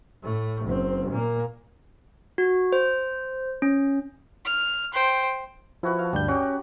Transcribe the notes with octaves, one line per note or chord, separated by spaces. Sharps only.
A2 A3
F#1 C4
A#2 A#3
F#4
C5
C#4
F6
C5 G5
F3 E4 F#4 B4
F5 A5
D2 G2 G3 G6
C#4 F#4 G4